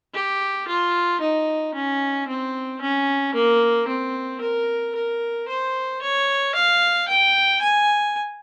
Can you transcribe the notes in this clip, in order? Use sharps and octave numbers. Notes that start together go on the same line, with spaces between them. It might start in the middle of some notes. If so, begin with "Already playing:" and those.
G4
F4
D#4
C#4
C4
C#4
A#3
C4
A#4
A#4
C5
C#5
F5
G5
G#5